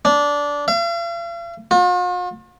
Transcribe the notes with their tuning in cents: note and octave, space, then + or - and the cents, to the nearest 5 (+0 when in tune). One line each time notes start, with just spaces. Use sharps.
D4 -15
F5 -45
F4 +45